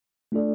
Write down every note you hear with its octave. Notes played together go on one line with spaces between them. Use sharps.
A3 D4 F4 A4 D5